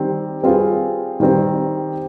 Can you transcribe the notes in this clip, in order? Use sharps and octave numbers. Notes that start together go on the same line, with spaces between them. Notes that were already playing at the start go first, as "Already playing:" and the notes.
Already playing: D#3 G3 C4
G3 C4 F4 G#4 B4
D#3 G3 C4